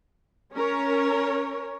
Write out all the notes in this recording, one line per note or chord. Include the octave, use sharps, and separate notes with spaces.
C#4 A#4 C#5